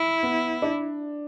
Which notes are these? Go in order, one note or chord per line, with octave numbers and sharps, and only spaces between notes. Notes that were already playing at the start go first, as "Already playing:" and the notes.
Already playing: E4
B3
D4